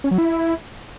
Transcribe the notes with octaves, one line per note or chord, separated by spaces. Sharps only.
C#4
F#3
E4